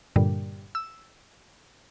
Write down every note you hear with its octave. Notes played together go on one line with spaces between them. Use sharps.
G2 A#2 D3 G3
E6